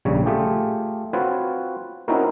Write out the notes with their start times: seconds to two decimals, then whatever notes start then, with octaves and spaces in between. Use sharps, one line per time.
0.05 A#1 C#3 G3 C#5
0.26 A3 F4 G4 G#4
1.13 C4 F4 F#4 B4 C#5
2.08 C4 C#4 D#4 E4 F#4 A#4